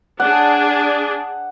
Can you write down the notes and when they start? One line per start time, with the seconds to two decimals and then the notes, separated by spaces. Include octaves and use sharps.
0.20 D4 G#4 F#5